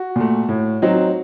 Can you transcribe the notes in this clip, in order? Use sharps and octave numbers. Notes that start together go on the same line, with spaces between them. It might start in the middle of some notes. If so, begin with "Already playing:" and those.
Already playing: F#4
A#2 A3
A2
F#3 C4 D#4